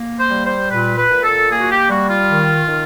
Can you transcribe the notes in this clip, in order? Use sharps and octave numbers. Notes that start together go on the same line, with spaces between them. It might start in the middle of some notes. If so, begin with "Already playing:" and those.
Already playing: A#3
C5
G3
C5
A#2 B4
B4
A#2
A4
A#3 G#4
F#4
G4
G3 F#4
F4
D#3
D#3